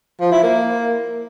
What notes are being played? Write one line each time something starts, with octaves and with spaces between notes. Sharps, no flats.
F3
E4
A#3